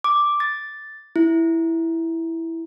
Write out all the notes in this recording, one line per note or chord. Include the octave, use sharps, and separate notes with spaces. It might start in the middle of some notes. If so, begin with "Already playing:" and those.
D6
A6
E4